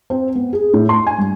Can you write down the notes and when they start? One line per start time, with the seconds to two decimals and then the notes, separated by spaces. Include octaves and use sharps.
0.10 C4
0.35 B3
0.53 G#4
0.73 A2
0.89 C6
1.07 G#5
1.18 G2